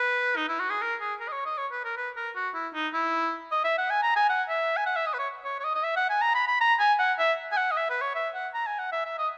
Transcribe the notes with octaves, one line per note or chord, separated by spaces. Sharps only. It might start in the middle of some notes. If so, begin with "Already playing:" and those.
Already playing: B4
D#4
E4
F#4
G#4
A#4
G#4
A#4
D#5
C#5
D#5
C#5
B4
A#4
B4
A#4
F#4
E4
D#4
E4
D#5
E5
F#5
G#5
A#5
G#5
F#5
E5
G#5
F#5
E5
D#5
B4
C#5
C#5
C#5
D#5
D#5
E5
F#5
G#5
A#5
B5
B5
A#5
G#5
F#5
E5
G#5
F#5
D#5
E5
B4
C#5
E5
F#5
A#5
G#5
F#5
E5
E5
D#5